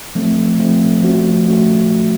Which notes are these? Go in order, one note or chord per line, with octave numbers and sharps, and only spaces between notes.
F3 A3 C4
F3 A3 C4
F3 A3 C#4 F#4
A3 C#4 F#4